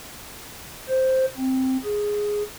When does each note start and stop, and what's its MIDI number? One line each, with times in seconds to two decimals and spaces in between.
0.89 1.26 72
1.37 1.77 60
1.84 2.43 68